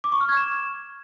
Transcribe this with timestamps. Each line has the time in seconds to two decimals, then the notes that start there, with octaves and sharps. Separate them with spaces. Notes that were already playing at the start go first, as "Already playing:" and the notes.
0.04 D6
0.12 C#6
0.20 F6
0.29 G#6
0.37 E7